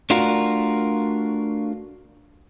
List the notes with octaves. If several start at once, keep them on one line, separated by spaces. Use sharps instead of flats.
A3 D4 F4 F#4 A#4